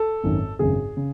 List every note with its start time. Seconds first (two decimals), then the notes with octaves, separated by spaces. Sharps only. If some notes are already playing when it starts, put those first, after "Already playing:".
Already playing: A4
0.23 G#1 F#2 D#3
0.59 G#1 F#2 C#3 G#4
0.97 C#3